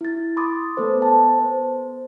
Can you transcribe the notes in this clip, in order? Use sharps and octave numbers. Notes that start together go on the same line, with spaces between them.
E4 A6
B5 C6 D6 D#6 A6
A3 B3 A4 C5
A5
B3 C5